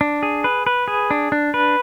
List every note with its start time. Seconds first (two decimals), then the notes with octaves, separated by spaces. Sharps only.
0.01 D4
0.23 G#4
0.44 B4
0.67 B4
0.88 G#4
1.11 D4
1.32 D4
1.54 B4